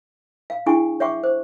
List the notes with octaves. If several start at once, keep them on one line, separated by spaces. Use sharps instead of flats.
F5
D4 E4 G#4 F#5 G#5 C#6
C#5 E5 F#5 G5 C#6 D6
C5